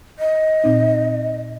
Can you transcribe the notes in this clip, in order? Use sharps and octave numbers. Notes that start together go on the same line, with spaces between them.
D#5
A#2 C4 D#4